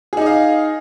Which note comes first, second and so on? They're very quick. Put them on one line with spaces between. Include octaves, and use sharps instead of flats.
G#4 D#4 D#5 F5